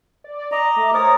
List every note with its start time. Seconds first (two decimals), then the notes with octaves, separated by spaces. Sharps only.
0.24 D5
0.52 D#5 A#5 D6
0.76 A3 E5
0.93 A#4 C5 C#5 D#6 A6